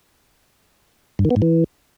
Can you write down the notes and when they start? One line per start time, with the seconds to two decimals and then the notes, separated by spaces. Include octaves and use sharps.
1.19 G2
1.25 D#3
1.31 B3
1.36 G#2
1.42 E3